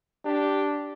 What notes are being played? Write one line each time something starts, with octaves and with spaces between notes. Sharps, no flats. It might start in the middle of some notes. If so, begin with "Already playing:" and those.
D4 G4